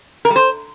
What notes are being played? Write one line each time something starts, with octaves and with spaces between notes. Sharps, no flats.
A#4
G3
C5